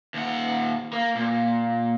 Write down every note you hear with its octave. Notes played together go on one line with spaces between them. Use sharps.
D#2 F#5
A#3
A#2